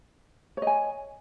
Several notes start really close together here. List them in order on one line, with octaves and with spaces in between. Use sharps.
C#5 D#5 G#5